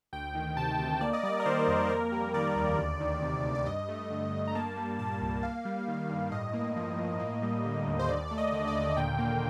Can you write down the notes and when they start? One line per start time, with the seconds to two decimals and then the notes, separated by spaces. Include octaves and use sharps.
0.13 D2 G5
0.35 D#3
0.57 C3 A5
0.79 D2
1.01 A#3 D5
1.13 D#5
1.23 G3 D5
1.40 A#4
1.46 D#3 C5
1.68 F2
1.89 A#3 A#4
2.12 G3
2.34 D#3 D5
2.56 D#2
2.78 D2
3.00 D#3
3.22 C3
3.44 D2
3.55 D5
3.66 G2 D#5
3.89 A3
4.11 D3
4.33 G2
4.47 A#5
4.55 A#3 A5
4.77 G3
4.99 A#2 A5
5.21 C2
5.43 A#3 F5
5.65 G3
5.88 D#3
6.09 G2
6.31 A2 D#5
6.53 A#3
6.76 F3
6.98 A2
7.20 A#3
7.42 G3
7.65 D3
7.86 D#2
7.99 C5
8.09 D#2 D5
8.28 A3 D5
8.38 D#5
8.53 D3
8.67 D5
8.75 D#2
8.97 A#2 G5
9.19 A#3